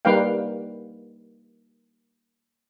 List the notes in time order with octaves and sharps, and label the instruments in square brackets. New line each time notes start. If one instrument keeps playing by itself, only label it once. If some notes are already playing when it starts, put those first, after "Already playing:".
[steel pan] G3 A#3 D#4 B4 F5 G5